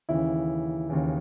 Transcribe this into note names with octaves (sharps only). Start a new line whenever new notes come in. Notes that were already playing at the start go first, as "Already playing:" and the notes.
D#2 C#3 E3 E4
D#2 C#3 E3